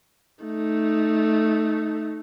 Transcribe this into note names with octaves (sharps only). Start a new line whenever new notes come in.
A3 D#4